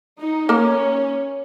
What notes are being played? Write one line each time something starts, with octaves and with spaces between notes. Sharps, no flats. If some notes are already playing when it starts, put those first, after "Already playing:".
D#4
A#3 C#4 A#4